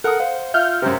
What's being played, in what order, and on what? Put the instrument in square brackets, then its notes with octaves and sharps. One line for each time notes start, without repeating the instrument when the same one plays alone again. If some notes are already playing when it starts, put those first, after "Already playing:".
[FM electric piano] A4 [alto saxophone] A#4 [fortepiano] F#5 D#6
[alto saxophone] C5 [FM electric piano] F5
[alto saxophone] F4 [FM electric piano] E5 F5 [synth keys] F6 G6
[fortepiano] F#2 C3 [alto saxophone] C4